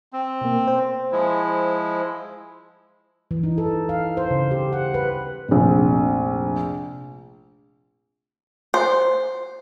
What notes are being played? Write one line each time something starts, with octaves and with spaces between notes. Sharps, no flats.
C4
B2 A#3
C5
F3 G#3 E4
E3
D#4
A4
F5
C5
C#3
G4
F#5
B4
F1 A#1
C5